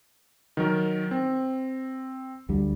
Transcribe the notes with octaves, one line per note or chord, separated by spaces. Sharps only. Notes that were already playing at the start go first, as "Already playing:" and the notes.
D#3 F#3 A#4
C4
D2 D3 G3